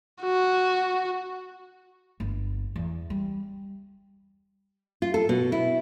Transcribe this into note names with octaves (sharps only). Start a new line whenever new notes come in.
F#4
G1
E2
G3
F4
A4
B2
E4